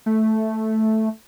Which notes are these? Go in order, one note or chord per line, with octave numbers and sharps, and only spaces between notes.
A3